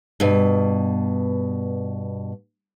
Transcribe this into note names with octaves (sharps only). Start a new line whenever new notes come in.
G2 B2